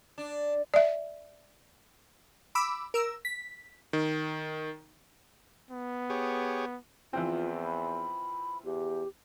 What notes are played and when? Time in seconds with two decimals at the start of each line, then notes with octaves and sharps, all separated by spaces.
0.18 D4
0.74 D5 E5
2.55 B5 D6 E6
2.94 A#4 E6
3.25 B6
3.93 D#3
5.70 B3
6.10 G4 G#4 C#5
7.13 E2 E3 F3 C4 F4
7.65 B5
8.65 E2 G4